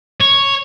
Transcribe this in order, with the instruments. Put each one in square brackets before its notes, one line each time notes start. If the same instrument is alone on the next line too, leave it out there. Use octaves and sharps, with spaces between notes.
[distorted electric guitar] C#5